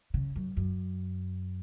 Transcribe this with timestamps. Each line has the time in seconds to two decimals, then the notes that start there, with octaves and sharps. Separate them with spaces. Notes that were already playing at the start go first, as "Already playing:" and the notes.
0.14 C#3
0.36 F#2
0.57 F#2